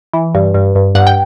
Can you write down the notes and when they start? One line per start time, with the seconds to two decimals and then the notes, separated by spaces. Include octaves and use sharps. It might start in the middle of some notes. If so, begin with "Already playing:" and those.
0.14 E3
0.35 G2
0.54 G2
0.75 G2
0.95 G2 F#5
1.07 G5